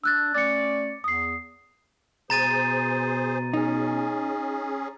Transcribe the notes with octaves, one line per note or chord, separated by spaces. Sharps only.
D4 E6 F#6 A6
A3 C#4 D5 A6 C#7
E2 D#6 C7
B2 G#4 C5 A#5 A6 D#7
C#4 D#4 G#4